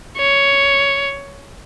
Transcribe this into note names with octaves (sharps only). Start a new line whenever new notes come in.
C#5